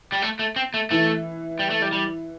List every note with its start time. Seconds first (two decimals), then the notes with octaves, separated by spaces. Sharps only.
0.12 G3
0.22 A3
0.39 A3
0.56 C4
0.74 A3
0.91 E3 A3
1.59 G3
1.70 A3
1.82 G3
1.93 G3